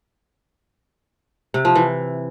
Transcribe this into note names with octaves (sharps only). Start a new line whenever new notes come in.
C3
F3
E3